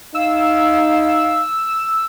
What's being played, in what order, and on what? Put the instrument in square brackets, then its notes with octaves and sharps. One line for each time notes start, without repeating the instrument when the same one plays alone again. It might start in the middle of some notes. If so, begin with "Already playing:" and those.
[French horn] D#4 [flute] F5 [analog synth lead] E6